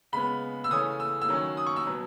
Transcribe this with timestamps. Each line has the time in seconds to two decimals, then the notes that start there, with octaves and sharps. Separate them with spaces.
0.12 C#3 G#3 B3 B5
0.64 E6
0.70 C#3 E3 A3 C#4 D#6
1.00 E6
1.21 E6
1.29 D#3 F#3 C#4
1.57 D#6
1.67 C#6
1.76 E6
1.86 B2 F#3 B3